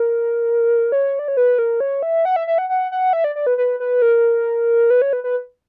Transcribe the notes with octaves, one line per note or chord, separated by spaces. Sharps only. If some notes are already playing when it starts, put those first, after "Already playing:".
Already playing: A#4
C#5
D5
C#5
B4
A#4
C#5
E5
F#5
E5
E5
F#5
F#5
F#5
E5
D5
D5
B4
B4
B4
A#4
B4
C#5
B4
B4